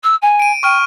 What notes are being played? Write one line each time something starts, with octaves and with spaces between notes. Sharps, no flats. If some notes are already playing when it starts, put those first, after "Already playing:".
E6
G#5
D7 D#7
G5 C#6 F6 D#7